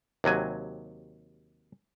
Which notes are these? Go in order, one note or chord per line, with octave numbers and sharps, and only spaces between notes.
D#2 C3 F#3 G#5